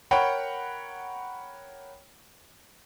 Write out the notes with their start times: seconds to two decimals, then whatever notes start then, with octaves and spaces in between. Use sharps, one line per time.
0.11 A#4 C#5 F#5 G5 B5